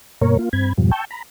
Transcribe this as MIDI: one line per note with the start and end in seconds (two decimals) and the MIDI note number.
0.21 0.37 43
0.21 0.37 47
0.21 0.37 58
0.21 0.37 70
0.21 0.37 73
0.39 0.49 58
0.39 0.49 65
0.53 0.73 43
0.53 0.73 60
0.53 0.73 83
0.53 0.73 92
0.78 0.91 41
0.78 0.91 44
0.78 0.91 47
0.78 0.91 53
0.78 0.91 55
0.91 1.05 79
0.91 1.05 81
0.91 1.05 85
0.91 1.05 88
0.91 1.05 91
1.11 1.22 82
1.11 1.22 83